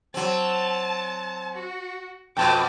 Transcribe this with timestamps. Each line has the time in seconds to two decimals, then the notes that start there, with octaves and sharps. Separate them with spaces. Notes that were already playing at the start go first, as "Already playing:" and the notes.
0.14 F#3 C4 A5
1.54 F#4
2.37 F2 B2 G5 A5 D6